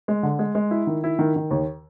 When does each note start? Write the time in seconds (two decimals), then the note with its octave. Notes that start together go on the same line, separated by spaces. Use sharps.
0.08 G#3
0.23 D3
0.39 G#3
0.55 G#3
0.71 E4
0.87 D#3
1.04 E4
1.19 D#3
1.36 D#3
1.51 D#2